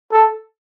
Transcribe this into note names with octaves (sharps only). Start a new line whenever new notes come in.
A4